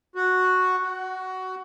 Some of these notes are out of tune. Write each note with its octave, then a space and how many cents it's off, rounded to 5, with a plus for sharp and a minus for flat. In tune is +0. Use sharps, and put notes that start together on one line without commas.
F#4 -5
F#4 +15